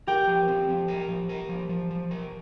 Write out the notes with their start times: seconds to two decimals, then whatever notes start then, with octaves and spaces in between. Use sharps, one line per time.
0.07 G4 A#4 G5
0.27 F3
0.48 C4
0.69 F3
0.88 A#4
1.08 F3
1.29 A#4
1.49 F3
1.69 F3
1.91 F3
2.11 A#4